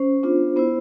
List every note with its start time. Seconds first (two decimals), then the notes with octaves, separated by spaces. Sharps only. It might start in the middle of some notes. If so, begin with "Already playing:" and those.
Already playing: C#4 C5
0.23 B3 D4 F4
0.56 B3 E4 C5